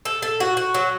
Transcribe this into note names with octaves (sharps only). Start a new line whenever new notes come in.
A4
A4
F#4
F#4
F#3